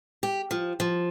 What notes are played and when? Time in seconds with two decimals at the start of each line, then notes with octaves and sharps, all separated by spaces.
0.23 G4
0.51 F3
0.80 F3